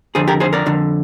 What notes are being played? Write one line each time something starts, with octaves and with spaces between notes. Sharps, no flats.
F2 D3 G#4 C5
G4 A#4
G#4 C5
A#4 D5
F2 D3